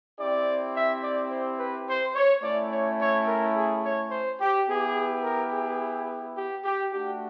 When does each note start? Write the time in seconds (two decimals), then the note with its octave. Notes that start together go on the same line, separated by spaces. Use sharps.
0.19 C4 E4 G4 D5
0.75 E5
1.03 D5
1.30 C5
1.59 B4
1.87 C5
2.15 C#5
2.43 A3 C#4 E4 D5
2.72 C#5
3.00 C#5
3.27 A#4
3.55 G#4
3.84 C#5
4.11 C5
4.40 G4
4.68 B3 E4 G4 G#4
5.24 A#4
5.52 G#4
6.37 G4
6.64 G4
6.92 A3 D4 F#4 G4